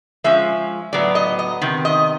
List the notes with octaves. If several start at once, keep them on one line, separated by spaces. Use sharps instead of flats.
F3 G#3 C#4 E5
A2 F#3 B3 D5
D#5
D#5
C3 D#3
D#5